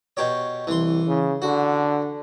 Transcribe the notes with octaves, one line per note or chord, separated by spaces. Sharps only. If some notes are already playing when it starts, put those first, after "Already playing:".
B2 G4 C#5
C2 E3 C6
C#3
D3 F#4